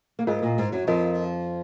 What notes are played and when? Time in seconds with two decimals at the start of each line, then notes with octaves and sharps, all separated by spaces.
0.19 A#3
0.27 G#2 G#3 F4 A#4 D#5
0.42 A#2 A#3
0.58 G#2 G#3
0.72 F#2 F#3
0.87 F2 F3 F4 A#4 D#5